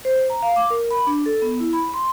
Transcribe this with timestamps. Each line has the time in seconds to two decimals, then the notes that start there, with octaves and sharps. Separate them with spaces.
0.05 C5
0.30 A#5
0.43 F5
0.56 D6
0.70 A#4
0.91 B5
1.07 D4
1.26 A4
1.42 B3
1.60 E4
1.73 B5
1.94 C6